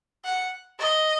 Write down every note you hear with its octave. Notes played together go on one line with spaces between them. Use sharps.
F#5
D#5